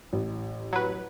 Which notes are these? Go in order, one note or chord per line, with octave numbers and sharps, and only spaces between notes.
A1
F#3 B4